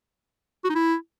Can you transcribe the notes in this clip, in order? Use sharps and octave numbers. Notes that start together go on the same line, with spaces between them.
F#4
D#4
E4